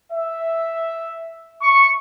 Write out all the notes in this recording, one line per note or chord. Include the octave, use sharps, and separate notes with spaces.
E5
C#6